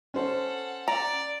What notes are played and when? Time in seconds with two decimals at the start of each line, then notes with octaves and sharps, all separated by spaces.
0.14 C#4 A4 C5 F#5
0.88 D5 A#5